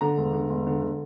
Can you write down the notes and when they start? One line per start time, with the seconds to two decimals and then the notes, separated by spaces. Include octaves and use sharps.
0.01 D3 A#5
0.18 E1
0.33 D3
0.50 E1
0.67 D3
0.82 D3